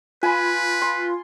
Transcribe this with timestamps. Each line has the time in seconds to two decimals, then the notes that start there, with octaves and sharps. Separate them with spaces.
0.23 F4 B4 G#5 B5
0.82 C6